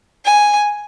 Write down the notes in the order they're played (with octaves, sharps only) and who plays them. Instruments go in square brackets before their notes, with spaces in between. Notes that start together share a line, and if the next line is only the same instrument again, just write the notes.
[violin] G#5